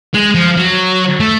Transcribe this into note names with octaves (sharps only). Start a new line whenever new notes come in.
G#3
F3
F#3
A3